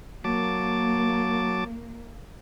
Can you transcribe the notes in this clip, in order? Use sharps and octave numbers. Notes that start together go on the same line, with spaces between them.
F#3 A#3 A5 D6